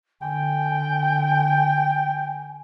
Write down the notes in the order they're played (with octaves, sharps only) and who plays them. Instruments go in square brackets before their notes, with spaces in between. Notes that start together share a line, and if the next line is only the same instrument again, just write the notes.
[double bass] D3 [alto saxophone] G5 [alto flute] G#5